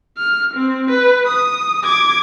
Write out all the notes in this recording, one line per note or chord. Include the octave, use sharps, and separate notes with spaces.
F6
C4
B4
D#6
D6 G#6